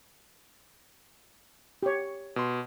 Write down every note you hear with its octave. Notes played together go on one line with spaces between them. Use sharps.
G4 C#5
B2 C6